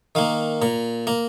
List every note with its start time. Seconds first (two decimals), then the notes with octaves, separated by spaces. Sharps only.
0.15 D#3 A#3 F5
0.62 A#2 A#5
1.07 A#3 A#5